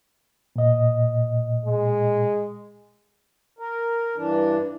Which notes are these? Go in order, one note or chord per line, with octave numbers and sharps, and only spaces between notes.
A#2 D#5
G#3
A#4
G2 E3 D4